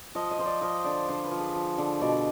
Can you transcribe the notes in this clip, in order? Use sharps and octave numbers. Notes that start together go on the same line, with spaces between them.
F3 D#5
D#5
F3 C5
D5
F3 D#5
D3 D5
D3 C5
B4
F3
G#4
F3
D3
B2 D5